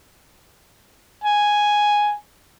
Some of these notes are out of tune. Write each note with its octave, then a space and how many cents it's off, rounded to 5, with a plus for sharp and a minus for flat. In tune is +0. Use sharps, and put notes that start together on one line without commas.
G#5 +0